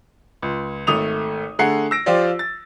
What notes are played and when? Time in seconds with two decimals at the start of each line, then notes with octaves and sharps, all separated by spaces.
0.42 C#2
0.87 G#1 A3 D#6 F7
1.59 D3 A3 G#4 F#5 A#5 C7
1.91 E6 A#6 D7
2.06 F3 F4 G4 C5 D5
2.39 A6